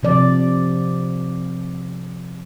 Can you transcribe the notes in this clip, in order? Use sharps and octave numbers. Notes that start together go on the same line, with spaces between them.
C3 F3 D5